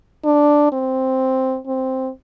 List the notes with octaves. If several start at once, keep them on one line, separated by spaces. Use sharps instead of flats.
D4
C4
C4